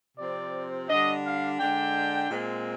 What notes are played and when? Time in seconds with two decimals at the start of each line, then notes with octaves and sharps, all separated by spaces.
0.18 C3 F3 C4 D5
0.89 D3 G3 D4 D#5
1.25 F5
1.60 D3 G#3 D4 G5
2.30 A#2 G#3 C4